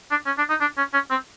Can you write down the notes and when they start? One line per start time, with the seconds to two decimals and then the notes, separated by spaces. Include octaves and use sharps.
0.11 D4
0.26 C#4
0.38 D4
0.49 D#4
0.61 D4
0.77 C#4
0.93 C#4
1.10 C4